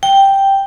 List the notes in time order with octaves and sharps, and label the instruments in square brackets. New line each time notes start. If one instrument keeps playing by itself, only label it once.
[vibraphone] G5